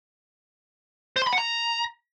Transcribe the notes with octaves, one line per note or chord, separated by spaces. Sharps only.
C5
C6
B5
F#5
A#5